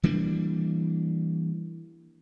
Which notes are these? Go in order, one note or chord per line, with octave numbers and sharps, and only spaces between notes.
E3 G3 A#3 D4